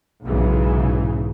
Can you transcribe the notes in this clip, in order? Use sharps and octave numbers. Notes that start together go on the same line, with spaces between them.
B1 G#2 C#3 E3